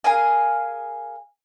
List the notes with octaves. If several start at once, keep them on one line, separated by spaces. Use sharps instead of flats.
G#4 A#4 F5 G#5